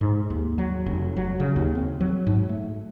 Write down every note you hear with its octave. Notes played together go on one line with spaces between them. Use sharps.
G#2
D#2
F#3
F1
F#3
C#3
D#2
C4
F#3
G#2
A3